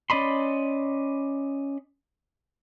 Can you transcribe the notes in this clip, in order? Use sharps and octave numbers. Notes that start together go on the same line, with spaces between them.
C#4 D5 D#5 B5 C6